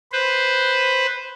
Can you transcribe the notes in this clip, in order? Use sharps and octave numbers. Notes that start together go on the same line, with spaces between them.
B4 C5